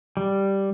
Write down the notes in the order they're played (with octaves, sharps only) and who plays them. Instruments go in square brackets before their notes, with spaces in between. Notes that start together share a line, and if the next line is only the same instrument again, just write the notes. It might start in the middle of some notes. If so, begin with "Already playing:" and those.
[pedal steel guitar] G3